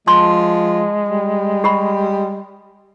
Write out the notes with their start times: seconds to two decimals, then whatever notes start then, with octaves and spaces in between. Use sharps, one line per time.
0.07 F3 G#3 A5 C6
1.09 G3
1.64 G4 B5